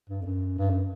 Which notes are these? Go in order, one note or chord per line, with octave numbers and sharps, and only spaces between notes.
G2
F2
F#2
G2
F#2